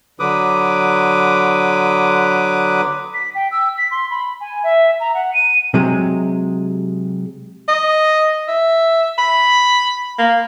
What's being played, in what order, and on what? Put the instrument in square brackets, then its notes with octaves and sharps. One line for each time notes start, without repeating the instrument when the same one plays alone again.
[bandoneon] D3 F#3 B4 D6 D#6
[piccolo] B6
G5
E6
B6
C6
B5
G#5
E5
A#5
F#5
D#7
[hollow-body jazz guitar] C3 F#3 G#3
[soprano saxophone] D#5
E5
B5
A#3